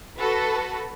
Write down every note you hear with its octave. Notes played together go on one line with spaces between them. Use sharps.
F#4 A4 B4